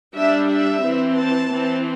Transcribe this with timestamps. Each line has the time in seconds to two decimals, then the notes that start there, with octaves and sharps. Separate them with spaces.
0.15 G3 D4 E5
0.49 E5
0.83 E3 C4
1.18 A5
1.52 E3 C4